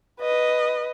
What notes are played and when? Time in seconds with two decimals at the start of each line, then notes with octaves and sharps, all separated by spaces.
0.21 B4 D#5